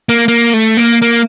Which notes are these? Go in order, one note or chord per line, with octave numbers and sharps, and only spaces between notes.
A#3
A#3
A3
A#3
A#3